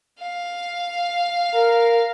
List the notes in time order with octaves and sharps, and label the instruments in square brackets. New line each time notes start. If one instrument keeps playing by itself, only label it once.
[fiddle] F5
[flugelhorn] A#4